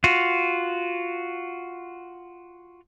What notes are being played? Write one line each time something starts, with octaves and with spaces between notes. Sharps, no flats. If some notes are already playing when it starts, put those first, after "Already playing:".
F4 F#4